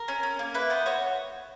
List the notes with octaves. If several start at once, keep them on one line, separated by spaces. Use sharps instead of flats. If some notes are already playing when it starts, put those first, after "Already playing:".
Already playing: A#4
C#4
C#4
A#3
E4 B4
B3 C5
F#4 C#5